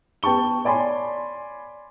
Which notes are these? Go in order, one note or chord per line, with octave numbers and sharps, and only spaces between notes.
B3 G5 A5 C#6 G7
C#5 D5 G#5 B5 C6